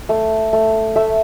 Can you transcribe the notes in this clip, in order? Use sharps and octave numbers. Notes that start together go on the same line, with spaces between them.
A3
A3
A3 E5